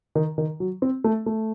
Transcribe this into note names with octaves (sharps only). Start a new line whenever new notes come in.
D#3
D#3
F#3
C4
A3
A3